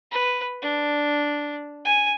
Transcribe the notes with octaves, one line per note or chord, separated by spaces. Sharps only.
B4
D4
G#5